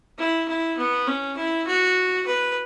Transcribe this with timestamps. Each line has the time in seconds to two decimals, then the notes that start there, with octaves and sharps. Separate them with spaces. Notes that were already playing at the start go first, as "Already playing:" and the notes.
0.19 E4
0.48 E4
0.78 B3
1.07 C#4
1.37 E4
1.67 F#4
2.27 B4